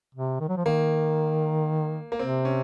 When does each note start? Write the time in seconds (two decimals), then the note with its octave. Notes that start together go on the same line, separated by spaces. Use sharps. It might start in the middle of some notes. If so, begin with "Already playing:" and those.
0.15 C3
0.40 D#3
0.49 F#3
0.57 F3
0.65 D#3 A#3
2.12 A#3
2.19 C3 C4
2.45 C#4